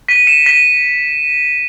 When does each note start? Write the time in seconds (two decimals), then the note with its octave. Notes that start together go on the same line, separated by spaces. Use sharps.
0.08 B6 D#7
0.27 C#7 E7
0.46 B6 D#7